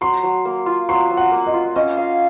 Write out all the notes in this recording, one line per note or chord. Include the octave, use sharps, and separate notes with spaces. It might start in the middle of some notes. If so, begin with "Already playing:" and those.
F#3 C6
F#3
A#3
F4
F#3 C6
F#3
F#5
A#3
D#5
F4
C#4 D#5
F5